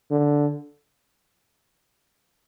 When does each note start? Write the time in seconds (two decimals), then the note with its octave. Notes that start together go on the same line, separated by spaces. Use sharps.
0.11 D3